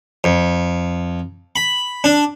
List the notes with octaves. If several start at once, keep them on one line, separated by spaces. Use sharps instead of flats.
F2
B5
D4